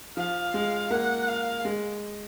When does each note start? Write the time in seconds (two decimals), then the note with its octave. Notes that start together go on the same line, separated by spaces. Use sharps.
0.17 F3 F5
0.54 G#3
0.90 A#3 F#5
1.29 F5
1.65 G#3